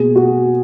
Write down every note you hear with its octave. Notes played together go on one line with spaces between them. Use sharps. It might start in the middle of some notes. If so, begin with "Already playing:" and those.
Already playing: B2 A#3 G#4
F#4